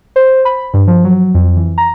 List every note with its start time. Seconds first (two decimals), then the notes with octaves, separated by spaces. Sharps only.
0.16 C5
0.45 B5
0.74 G2
0.87 F3
1.04 F#3
1.34 F2
1.57 E3
1.78 A#5